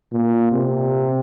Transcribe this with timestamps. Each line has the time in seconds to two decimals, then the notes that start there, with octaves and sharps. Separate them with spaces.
0.12 A#2
0.52 C3